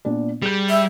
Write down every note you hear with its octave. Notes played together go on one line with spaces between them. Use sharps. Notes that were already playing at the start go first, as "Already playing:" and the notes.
A#2 B3 D4
G3 G#4 G6
E5